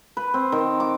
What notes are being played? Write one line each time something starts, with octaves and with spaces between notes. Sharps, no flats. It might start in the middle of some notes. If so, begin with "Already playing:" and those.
B4
C4
D#3
D6